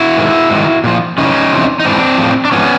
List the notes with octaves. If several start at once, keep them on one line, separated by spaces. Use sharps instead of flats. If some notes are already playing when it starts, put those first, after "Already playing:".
Already playing: E4 F#4
G#2 D#3
G#2 D#3
A#2 F3
F#2 C#3 E3 C#4 D#4
E2 C3 F3
D#4
G#2 E3 C4 D4
A2 F3
D4
G#2 F3 B3 C#4